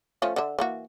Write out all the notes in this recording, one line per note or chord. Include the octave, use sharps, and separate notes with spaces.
F3 A3 C#4
D3 E5
E3 A#3 F#4